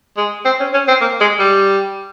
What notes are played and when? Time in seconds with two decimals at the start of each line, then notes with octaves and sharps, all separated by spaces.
0.17 G#3
0.45 C4
0.60 C#4
0.73 C#4
0.88 C4
1.01 A#3
1.21 G#3
1.39 G3